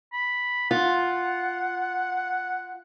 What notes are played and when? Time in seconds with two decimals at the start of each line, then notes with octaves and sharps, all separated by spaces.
0.13 B5
0.71 F4 F#5